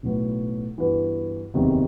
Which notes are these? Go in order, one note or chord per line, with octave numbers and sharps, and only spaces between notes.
B1 A2 F#3 B3 F#4
G2 E3 B3 F#4 B4
F#1 E2 C3 D#3 F#3